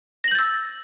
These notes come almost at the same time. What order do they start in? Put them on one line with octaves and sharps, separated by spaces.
A#6 F#7 G6 A6 E6